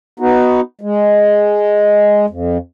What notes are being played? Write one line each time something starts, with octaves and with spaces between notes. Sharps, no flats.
B3 D#4 F#4
G#3
F2